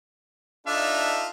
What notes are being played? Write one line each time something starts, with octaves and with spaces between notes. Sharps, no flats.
D4 D#4 F4 A4 E5